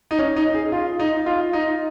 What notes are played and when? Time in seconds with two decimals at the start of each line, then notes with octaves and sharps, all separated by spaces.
0.11 D#4
0.19 C#4
0.36 D#4
0.54 G#4
0.72 F4
0.99 D#4
1.26 F4
1.53 D#4